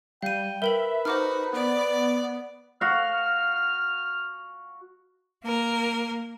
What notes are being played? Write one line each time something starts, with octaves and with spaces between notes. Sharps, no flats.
G3 F5 G5 D#7
A#4 B4 E5 G5 F#7
D#4 F#4 C5 D6 F6
B3 D5
F#4 F5 F6
A#3 A#4